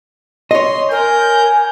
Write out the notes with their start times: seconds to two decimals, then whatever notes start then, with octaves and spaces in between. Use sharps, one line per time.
0.51 C#5 D#5 C6
0.91 A#4 G#5 G6